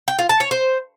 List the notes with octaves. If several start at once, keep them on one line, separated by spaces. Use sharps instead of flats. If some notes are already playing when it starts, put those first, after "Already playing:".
G5
F4
A5
C#5
C5